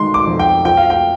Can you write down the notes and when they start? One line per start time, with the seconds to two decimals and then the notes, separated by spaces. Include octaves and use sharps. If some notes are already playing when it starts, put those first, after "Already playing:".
Already playing: D#3 G#3 D#4 C6
0.14 D6
0.27 F2
0.39 G5
0.65 F3 G5
0.77 F5
0.90 G5